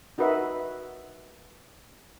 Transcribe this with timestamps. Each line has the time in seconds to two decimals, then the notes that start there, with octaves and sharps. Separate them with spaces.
0.18 D#4 F#4 A#4 B4 D#5 E5